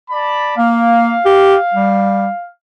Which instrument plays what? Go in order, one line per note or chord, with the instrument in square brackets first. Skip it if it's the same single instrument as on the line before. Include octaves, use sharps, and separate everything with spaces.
[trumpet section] D5 A5 B5
[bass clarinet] A#3 [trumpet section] F5
[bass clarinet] G4
G3